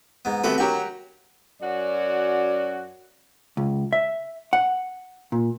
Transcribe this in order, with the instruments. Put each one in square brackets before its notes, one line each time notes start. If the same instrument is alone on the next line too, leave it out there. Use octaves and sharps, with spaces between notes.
[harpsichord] G#2 B3
[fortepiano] A3 B3 F#4 [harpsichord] C4 G4 B4
[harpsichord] F#3 C#6 [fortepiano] F#4 G4 A#4
[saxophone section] F#2 C#4 F#4 [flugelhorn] D5
[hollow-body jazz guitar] C#2
E5
F#5
A#2